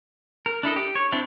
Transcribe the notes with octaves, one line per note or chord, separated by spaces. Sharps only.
A#4
D4 E4 A4 D#5
G4
C#5
C4 D4 E4